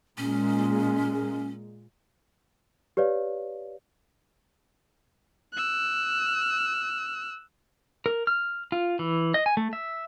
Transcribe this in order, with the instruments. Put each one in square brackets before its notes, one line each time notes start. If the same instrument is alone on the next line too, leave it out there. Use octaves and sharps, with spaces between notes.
[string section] A#2 G#3 [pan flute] C#4
[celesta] G4 B4 C#5 D5 F5
[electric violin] E6 F#6
[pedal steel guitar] A#4
F6
F4
E3
D#5
G#5
A3
E5